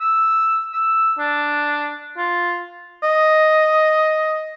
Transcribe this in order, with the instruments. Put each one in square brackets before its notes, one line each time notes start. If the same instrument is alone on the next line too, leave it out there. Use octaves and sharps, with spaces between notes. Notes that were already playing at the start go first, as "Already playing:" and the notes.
[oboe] E6
E6
D4
F4
D#5